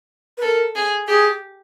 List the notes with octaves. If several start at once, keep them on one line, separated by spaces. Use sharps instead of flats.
B4
A4 A#4
G#4
G4 G#4